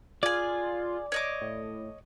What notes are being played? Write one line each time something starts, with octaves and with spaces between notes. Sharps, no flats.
F4 G#4 D5 G#5
C#5 D#5 D6
A2